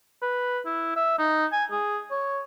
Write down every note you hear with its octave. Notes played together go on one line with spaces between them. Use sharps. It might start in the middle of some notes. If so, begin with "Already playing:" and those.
B4
E4
E5
D#4
G#5
G#4
C#5